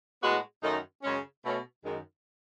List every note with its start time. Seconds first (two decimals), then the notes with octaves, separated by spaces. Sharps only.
0.22 A2 G#3 B3 F#4
0.62 F#2 D#3 A3 D#4
1.02 F#2 C#3 G#3 C#4
1.43 B2 A3 C#4
1.83 F#2 D#3 G#3